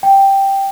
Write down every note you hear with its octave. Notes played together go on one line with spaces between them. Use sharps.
G5